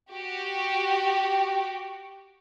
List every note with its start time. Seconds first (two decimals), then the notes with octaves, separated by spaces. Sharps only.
0.11 F#4 G4